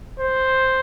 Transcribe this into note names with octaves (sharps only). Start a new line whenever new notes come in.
C5